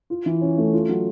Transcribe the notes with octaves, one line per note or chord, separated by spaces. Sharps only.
F4
E3
C#4
A3
F4
F#3